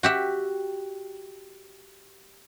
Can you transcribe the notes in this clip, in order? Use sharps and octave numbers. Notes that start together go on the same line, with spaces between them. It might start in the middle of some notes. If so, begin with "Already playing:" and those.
F#4 G4 E5